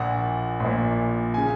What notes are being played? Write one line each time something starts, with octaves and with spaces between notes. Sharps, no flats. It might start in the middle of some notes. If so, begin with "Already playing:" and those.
Already playing: A#1 A#2 F#5
A#1 A#2
C#3 G#5